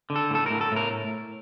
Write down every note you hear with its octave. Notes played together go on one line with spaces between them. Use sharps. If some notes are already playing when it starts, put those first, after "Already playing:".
D3
A4
A2 A4
A2 A#4
A4
A2 A#4